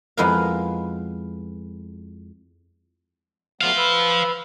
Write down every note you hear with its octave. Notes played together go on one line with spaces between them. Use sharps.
F2 G#3 B3 E4 A#4 F5
F#3 A3 B3 C5 F5
B4 E6